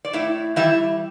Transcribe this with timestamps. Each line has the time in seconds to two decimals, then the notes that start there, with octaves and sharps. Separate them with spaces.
0.05 D5
0.13 A2 E4 E5
0.56 E3 G3 E4 E5